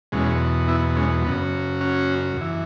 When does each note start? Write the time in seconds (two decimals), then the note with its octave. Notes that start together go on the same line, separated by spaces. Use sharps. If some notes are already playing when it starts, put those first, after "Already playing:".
0.12 E2 B2 F#3 G#3 C#4
0.68 B3 E4
0.97 G#3 C#4
1.25 F#2 C#3 F#3 B3
1.81 C#4 F#4
2.37 F#2 E3